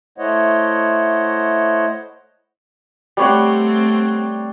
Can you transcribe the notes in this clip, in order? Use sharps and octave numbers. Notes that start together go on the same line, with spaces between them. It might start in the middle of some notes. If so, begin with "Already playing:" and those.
A3 E4 C5 C#5 D#5 F#5
G3 A3 C4 C#5 F#5